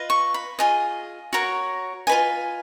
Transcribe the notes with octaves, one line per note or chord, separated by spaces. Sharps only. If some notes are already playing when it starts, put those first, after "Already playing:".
Already playing: F4 B4 D#5
C#6
B5
F4 G#4 D#5
F#4 A#4 C#5
F4 B4 D#5 G#5